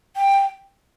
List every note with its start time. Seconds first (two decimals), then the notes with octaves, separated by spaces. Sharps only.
0.16 G5